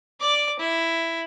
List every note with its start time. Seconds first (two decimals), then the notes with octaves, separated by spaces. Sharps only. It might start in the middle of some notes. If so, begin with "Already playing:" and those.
0.21 D5 D6
0.59 E4